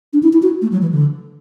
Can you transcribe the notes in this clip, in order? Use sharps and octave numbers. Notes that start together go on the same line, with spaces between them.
D4
E4
E4
F#4
A3
F#3
E3
D3